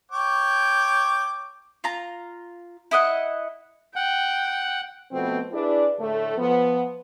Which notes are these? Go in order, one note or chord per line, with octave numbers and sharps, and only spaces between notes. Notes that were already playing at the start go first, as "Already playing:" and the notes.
C#5 G5 D6
F4 A#5
E4 D#5 F#5
F#5 G5
B2 F3 A3 B3 C4
D4 E4 G#4 B4 D5
A2 D3 A3
F3 B3